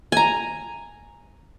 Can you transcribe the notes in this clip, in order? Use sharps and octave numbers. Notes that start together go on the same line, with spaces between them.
G#5 A#5